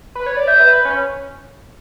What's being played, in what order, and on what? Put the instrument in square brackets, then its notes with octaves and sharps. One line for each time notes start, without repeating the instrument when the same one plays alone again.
[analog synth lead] B4
C#5
D5
[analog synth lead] E5 [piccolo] G6
[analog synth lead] B4
B4
C#4